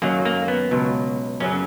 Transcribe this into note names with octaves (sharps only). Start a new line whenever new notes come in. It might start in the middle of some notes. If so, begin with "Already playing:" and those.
F#2 D#3 F#3 A#3
A#3
B3
C#2 B2 F#3
F#2 C#3 F#3 C#4